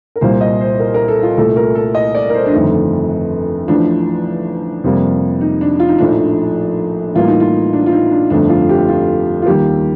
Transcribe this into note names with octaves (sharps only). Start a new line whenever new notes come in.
A#4
C2 A#2 G3 A#3 C5
D#5
C5
A#4
A#4
A4
F4
C2 A#2 A3 A4
A#4
A4
D#5
D5
A#4
C5
D4
G1 F2 D#3 A3 D#4
A1 A2 F3 D4
F2 C3 G3 A#3
D#4
D4
F4
D#4
A#1 A2 F3 A3 D4
D#4
A1 A2 G3 A#3 F4
D#4
F4
D4
F4
D#4
D4
G1 F2 D3 A3 D4
F4
G4
F4
F4
D#2 D#3 G3 A#3 G4